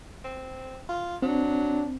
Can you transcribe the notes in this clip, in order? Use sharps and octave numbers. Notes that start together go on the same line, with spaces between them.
C4
F4
F#3 C4 D4